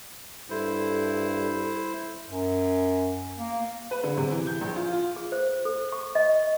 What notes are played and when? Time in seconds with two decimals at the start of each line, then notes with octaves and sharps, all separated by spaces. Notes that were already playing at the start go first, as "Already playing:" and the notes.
0.50 G2 E4 A4 C5
2.28 F#2
3.39 A#3
3.91 B4
4.03 D3
4.17 C3
4.31 E3
4.47 G6
4.61 A#1
4.76 F4
4.92 F4
5.16 G#4
5.32 C5
5.65 A4
5.92 C#6
6.15 D#5